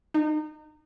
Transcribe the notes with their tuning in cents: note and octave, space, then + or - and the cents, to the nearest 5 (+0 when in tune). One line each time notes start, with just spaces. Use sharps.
D#4 -30